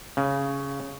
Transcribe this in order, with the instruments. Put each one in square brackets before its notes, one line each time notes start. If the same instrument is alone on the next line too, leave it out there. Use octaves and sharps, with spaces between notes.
[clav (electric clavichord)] C#3